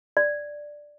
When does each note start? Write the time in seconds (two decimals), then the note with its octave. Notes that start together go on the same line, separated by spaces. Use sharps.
0.17 D5